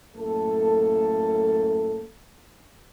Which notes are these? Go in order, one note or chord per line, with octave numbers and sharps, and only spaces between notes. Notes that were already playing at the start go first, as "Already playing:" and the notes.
F#2 A2 A#3 A4